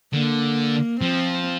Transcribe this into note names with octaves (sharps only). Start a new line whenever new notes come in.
D3 A#3
F3 C4